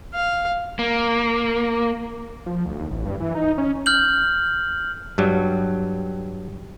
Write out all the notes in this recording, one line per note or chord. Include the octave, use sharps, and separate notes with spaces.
F5
A#3
F3
D2
D#2
A1
G2
E3
D#4
C#4
F6 G6 F#7
G2 F#3 G3